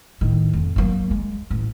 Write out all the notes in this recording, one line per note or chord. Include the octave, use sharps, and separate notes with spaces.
A2 D#3
F2
F#3 A#3
G#3
A1